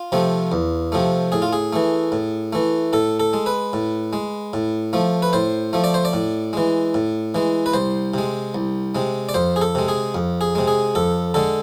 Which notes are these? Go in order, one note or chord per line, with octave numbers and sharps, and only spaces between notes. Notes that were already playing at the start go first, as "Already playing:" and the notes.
Already playing: F4
C3 F3 A3
E2
C3 F3 A3
A2 G#4
F4
G#4
E3 A3
A2
E3 A3
A2 A4
A4
G#3
B4
A2
G#3
A2
F3 A3
B4
A2 C5
F3 A3
D5
C5
D5
A2
E3 G#3
A2
E3 G#3
B4
C2 C5
C3 G#3
C2
C3 G#3
D5
F2 C5
G#4
A4
C3 G#3
G#4
F2
G#4
C3 G#3
G#4
F2 A4
D3 G#3 A4